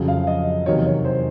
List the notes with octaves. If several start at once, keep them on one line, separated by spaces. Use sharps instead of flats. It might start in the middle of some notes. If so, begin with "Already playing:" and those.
Already playing: F2 C#3 F#3
F5
D#5
E2 C3 D#3 F#3 C#5
C#5
C5